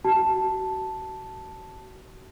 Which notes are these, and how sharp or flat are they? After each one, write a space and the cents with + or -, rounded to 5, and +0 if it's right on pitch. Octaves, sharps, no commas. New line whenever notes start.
F#4 +30 A5 +0